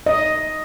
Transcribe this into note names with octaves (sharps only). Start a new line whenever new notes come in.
D#5